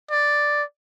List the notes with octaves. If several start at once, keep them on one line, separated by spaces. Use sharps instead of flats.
D5